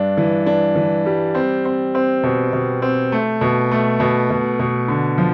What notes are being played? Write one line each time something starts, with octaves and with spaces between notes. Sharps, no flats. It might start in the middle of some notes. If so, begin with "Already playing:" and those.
Already playing: G2 D4
E3
D4
E3
G3
C4
C4
C4
B2
B2
C4
A3
B2
A3
B2
B2
B2
D3
F3